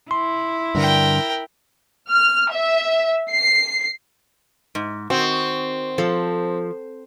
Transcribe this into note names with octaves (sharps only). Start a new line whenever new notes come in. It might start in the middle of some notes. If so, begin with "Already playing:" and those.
E4 C6
G2 D3 A#4 G5
F6
E5
C7
G#2
D#3 C4 F#4
F3 A4